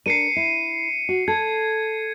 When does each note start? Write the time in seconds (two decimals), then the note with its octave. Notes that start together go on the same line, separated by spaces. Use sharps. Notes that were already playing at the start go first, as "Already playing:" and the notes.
0.06 D4 A#4 C7 C#7 D#7
0.36 E4
1.09 F#4
1.28 A4 G#6